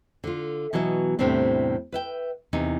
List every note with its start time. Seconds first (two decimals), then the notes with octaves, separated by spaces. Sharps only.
0.24 D3 F4
0.73 B2 E3 F#3 D#5 E5
1.19 E2 A2 C3 G3 C4 D4
1.92 B4 E5 G5
2.53 E2 C3 D#4